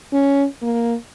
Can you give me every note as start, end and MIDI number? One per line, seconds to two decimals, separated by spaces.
0.13 0.45 61
0.62 0.95 58